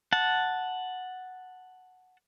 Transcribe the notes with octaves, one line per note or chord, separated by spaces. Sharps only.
F#5 A5